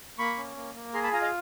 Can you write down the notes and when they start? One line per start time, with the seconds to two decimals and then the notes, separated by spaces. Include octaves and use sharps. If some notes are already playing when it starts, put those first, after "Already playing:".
0.18 A#3 B5 C#6
0.37 C#4
0.56 A#3
0.75 A#3
0.94 G#4 A#5 C6
1.03 A5 B5
1.12 F4 G#5 A#5
1.22 D#5 F5